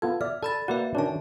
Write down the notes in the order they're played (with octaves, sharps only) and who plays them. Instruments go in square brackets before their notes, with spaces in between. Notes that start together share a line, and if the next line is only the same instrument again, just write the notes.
[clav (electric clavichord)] B3 F4 A4 [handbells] G#6
[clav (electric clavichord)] D5 E5 [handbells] F6
[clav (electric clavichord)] A4 [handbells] D5 B5 A6
[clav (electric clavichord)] A#3 D5 F#5 [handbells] F#4 B4 E5
[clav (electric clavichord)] D#3 C#4 D4 [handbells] F#4 A5